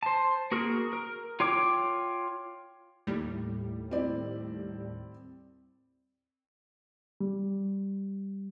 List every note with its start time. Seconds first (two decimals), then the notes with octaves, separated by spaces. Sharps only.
0.03 C5 A5
0.52 A#3 F#4 G#4 A#4
0.93 A#4
1.40 F4 C#5 G5 D6
3.07 D#2 A2 G3
3.91 C4 E4 D5
7.21 G3